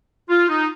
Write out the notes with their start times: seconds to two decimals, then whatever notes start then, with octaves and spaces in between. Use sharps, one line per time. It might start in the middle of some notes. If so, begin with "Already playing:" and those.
0.29 F4
0.49 D#4